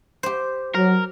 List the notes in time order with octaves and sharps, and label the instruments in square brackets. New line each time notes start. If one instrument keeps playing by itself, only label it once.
[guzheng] G4 C5
[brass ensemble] F#3 [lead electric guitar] A#4